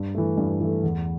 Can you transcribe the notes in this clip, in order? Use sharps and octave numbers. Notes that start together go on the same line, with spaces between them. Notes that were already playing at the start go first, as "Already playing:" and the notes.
Already playing: G2
E3 A3
G2
E3 A3
E2